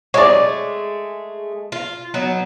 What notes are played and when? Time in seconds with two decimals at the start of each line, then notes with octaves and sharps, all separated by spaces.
0.14 G#3 A3 G#4 C#5 D5
1.72 F4
2.14 F#3 B3 D#4